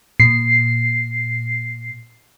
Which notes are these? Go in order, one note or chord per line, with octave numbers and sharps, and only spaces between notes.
A#2 C7